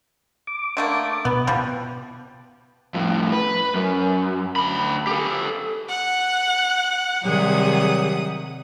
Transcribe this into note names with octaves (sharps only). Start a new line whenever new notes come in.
D6
D3 A3 A#3
B2 B3
E3 F3 G3
F2 A2
B4
F#2
D2 B5
G4 A4
F#5 F#6
C3 D#3 F#3 G3 G#4 F#5 D#6